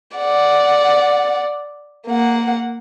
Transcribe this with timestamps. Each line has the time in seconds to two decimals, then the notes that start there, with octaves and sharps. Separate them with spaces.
0.18 D5 F#5
2.07 A#3 F#5